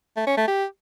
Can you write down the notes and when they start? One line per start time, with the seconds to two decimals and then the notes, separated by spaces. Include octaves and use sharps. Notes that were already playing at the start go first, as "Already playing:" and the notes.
0.16 A3
0.27 C#4
0.37 A3
0.48 G4